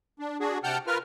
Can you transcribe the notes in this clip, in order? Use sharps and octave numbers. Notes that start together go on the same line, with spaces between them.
D4
D4 F#4 G#4
C3 F#5 G5 A5 F6 G6
F4 A#4 B4 F6